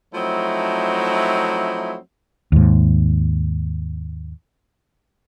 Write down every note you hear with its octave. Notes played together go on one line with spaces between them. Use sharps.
F3 F#3 A3 C4 D#4 E4
D#2 G#2